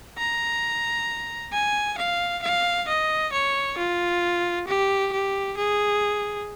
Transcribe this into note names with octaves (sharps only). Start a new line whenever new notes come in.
A#5
G#5
F5
F5
D#5
C#5
F4
G4
G4
G#4